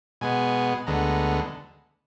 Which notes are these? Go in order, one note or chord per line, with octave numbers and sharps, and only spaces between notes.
B2 G#3 B3 G#5
D2 D3 G#3 B3 A#5